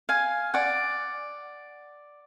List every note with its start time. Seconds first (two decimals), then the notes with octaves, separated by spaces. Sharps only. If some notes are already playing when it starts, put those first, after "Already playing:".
0.09 F5 G#5
0.54 D5 F#5